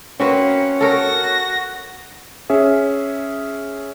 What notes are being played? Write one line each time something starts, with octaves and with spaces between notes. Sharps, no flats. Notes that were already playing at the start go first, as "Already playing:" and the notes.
A#3 C4 C#4 F#4 B4
F#4 A4 A#4 C#5 A#6
C#4 G#4 E5